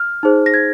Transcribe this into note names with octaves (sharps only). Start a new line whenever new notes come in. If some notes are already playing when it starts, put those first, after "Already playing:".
Already playing: F6
D#4 G#4 C5
A#6
G#6